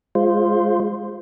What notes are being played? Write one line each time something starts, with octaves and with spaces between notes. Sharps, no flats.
G#3 F4 C5